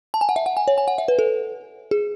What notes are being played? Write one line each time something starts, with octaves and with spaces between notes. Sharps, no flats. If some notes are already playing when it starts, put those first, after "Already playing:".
A5
G#5
F#5
E5
F#5
G#5
C#5
G#5
F#5
E5
B4
A4
G#4